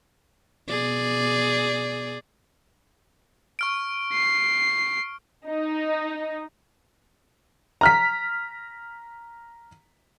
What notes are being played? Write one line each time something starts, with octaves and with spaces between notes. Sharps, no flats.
B2 G#4 D5
C#6 F6 D7
C7
D#4
A#5 F6 B6